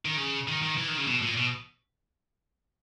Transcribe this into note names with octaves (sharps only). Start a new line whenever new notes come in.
D#3
C#3
D#3
D#3
E3
D#3
C#3
B2
A#2
B2